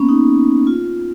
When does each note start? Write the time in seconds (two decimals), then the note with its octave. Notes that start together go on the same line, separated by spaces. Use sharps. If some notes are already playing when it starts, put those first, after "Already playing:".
Already playing: A#3 B3 C#4
0.09 D#4
0.67 F4